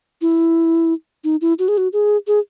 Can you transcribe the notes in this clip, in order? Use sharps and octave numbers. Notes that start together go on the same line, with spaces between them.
E4
D#4
E4
F#4
G#4
F#4
G#4
G#4